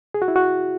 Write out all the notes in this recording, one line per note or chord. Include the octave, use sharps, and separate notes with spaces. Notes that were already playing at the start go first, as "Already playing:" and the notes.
G#4
F#4
E4
F#4